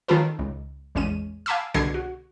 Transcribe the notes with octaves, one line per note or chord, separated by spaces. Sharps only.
D#3 C#4 F4 A4 B4
C#2
A1 E2 G#3 C#4 D#7
F5 G#5 A5 B5 D6 E6
C2 B2 D3 G#6 C7
F#4